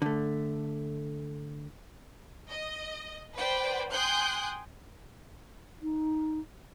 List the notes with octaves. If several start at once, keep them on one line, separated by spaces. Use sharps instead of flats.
D3 A3
D#5
B4 C5 D5 G5
G5 G#5 C6 D#6 F#6 G6
D#4